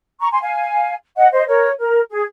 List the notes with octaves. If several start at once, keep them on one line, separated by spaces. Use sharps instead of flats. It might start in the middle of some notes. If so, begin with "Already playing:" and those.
A#5 C#6
G#5 C6
F5 G#5
D#5 F#5
C5 D#5
A#4 C#5
A#4
G#4